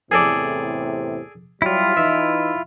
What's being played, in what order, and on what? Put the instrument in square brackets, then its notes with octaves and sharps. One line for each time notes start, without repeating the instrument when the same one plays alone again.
[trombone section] E2 A2 C3 [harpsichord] G#4 A4 D5
[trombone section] F#3 G3 [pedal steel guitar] E4 F4
[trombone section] E3 D#4 [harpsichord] E5